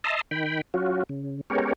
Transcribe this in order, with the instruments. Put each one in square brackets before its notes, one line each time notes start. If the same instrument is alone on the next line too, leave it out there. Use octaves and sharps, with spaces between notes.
[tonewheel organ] D#5 E5 A5 A#5 C6
D#3 G5 B5
F#3 C#4 F4 F#4
C#3
G#3 B3 C#4 G4 A#4 C#5